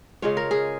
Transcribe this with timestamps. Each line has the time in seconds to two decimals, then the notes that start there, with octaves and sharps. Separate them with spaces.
0.22 C#3 G#3 C#4 F4 C#5
0.37 A#4
0.51 G#4